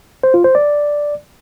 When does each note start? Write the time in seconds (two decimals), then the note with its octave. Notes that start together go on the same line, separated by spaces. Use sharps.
0.23 C5
0.34 F4
0.44 C5
0.55 D5